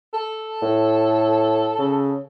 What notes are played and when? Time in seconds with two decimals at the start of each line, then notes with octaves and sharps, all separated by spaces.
0.14 A4
0.62 A2
1.79 C#3